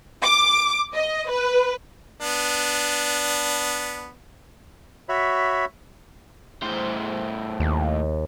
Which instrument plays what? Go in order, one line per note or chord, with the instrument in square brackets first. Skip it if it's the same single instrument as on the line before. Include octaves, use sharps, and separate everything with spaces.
[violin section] D6
D#5
B4
[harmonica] B3 D4
[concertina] F#4 C#5 E5 B5
[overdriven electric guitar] A2 C5
[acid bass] D#2